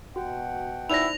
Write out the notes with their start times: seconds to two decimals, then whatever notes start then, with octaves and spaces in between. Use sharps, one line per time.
0.16 B2 F#4 F#5 G5
0.90 D#4 E4 C5 D5 A#6 F7